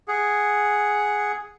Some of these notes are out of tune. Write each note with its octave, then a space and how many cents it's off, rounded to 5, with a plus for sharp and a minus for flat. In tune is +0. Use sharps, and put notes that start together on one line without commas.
G#4 +0 F#5 +0